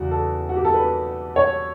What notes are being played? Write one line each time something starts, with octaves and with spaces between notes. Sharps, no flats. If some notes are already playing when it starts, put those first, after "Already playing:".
Already playing: E2 C#3 E3 F#4
A4
F#4
G4
A4
B4
C#5